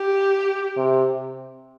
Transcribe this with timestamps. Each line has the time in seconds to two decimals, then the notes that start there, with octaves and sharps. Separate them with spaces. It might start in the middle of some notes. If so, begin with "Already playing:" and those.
Already playing: G4
0.77 C3